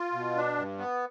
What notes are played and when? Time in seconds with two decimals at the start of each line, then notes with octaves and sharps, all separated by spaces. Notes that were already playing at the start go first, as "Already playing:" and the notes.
Already playing: F4
0.13 B2
0.36 D4
0.57 G2
0.78 B3